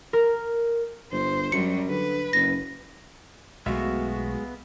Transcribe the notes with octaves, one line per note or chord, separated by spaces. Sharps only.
A#4
G1 C5
F#2 F#3 G3 C#7
D3 B4
F#1 A#6
B1 B2 G#3 A3 B3 F#4 E5 F5